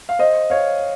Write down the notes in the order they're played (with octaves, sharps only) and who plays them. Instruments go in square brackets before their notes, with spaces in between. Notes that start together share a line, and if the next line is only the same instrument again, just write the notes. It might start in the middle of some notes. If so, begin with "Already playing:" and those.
[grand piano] F5
C5 D#5
C#5 F5